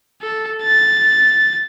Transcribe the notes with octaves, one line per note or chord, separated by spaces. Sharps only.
A4
A6